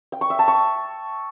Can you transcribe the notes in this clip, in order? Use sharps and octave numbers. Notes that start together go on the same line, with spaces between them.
G5
C#6
E5
A5
C#6